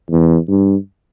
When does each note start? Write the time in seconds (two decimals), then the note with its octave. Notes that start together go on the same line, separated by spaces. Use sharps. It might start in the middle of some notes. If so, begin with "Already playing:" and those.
0.10 E2
0.49 G2